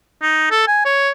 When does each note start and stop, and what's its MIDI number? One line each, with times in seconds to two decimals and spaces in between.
0.22 0.47 63
0.51 0.63 69
0.68 0.81 80
0.85 1.10 73